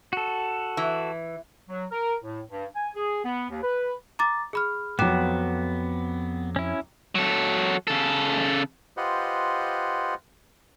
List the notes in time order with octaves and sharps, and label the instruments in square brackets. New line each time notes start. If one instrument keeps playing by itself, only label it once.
[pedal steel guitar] F#4 A4
[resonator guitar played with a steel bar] E3
[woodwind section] F#3
A#4
A2
G2
G#5
G#4
B3
D#2
B4
[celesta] A#5 D6 A6
G#4 B5 F6
[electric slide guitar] F2 G#2 [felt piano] F#3 D6 [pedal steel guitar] B3 [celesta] G5 F#6 E7
[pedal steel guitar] C#4 E4
[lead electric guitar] F#3 A4
C#3 A4
[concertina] F4 G4 B4 C5 D#5 F#5